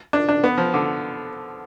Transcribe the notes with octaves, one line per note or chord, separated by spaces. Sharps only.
D4
D4
B3
F3
D3